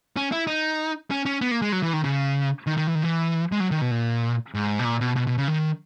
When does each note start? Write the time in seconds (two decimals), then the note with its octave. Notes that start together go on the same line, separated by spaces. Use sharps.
0.17 C#4
0.32 E4
0.47 D#4
1.11 C#4
1.26 C#4
1.41 B3
1.51 A#3
1.62 G#3
1.72 F#3
1.83 E3
1.93 D#3
2.04 C#3
2.67 D#3
2.77 D#3
2.87 E3
2.95 D#3
3.03 E3
3.52 G#3
3.60 F#3
3.71 D#3
3.81 B2
3.91 A#2
4.55 G#2
4.79 B2
4.85 A#2
5.01 B2
5.16 B2
5.27 B2
5.38 C#3
5.48 D#3